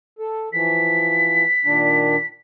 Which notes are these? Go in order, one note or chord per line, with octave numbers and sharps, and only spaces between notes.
A4
E3 F3 B6
A#2 D#3 D4